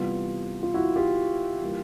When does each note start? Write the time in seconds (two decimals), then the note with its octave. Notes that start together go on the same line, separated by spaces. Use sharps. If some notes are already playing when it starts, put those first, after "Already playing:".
Already playing: C3 E3 G3 B3 F4
0.63 F4
0.74 E4 F#4
0.96 F4 G4
1.61 E3 G3 A#3